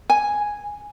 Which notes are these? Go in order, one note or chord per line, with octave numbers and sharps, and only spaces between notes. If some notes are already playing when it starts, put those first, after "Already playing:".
G#5